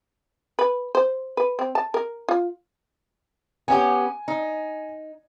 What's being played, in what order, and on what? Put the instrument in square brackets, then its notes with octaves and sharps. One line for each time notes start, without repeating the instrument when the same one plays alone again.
[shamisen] B4
C5
B4
C4
A5
A#4
F4
[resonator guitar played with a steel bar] B3 C#4 G4 [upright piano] G#5
[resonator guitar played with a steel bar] D#4